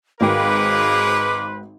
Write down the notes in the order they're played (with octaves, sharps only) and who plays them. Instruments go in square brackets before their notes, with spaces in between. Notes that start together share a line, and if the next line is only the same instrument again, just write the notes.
[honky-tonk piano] G#1 F#4 G5 [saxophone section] G#3 A#3 [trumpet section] B4 C5 [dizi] D6